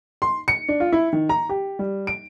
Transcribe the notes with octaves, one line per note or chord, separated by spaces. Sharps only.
C6
C#7
D4
F4
E4
D#3
A#5
G4
G3
D7